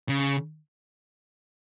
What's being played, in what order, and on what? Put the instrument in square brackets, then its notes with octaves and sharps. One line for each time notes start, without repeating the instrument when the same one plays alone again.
[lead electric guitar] C#3